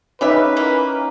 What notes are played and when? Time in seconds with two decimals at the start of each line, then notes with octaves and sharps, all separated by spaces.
0.21 C#3 C#4 D#4 G4 B4 E5
0.57 E3 A#3